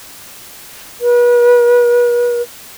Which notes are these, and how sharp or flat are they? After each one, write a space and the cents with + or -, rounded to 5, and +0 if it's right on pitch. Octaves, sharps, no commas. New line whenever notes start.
B4 -40